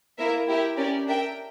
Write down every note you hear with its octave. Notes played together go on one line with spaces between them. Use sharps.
A#3 E4 A#4 E5
E4 G4 A#4 E5 G5
C#4 G4 A#4 D5
D4 A#4 E5 G5